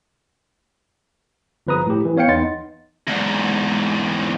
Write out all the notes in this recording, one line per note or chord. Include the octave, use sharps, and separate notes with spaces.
G1 F3 B4 A#5 D#6
A2 G4
E3
B3 C#5 F5 G5 C#7
E2 B3 D#4 D#5 C6 A6
E2 G#2